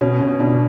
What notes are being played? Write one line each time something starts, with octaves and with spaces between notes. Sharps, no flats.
B2 C#4
B2
B2 D4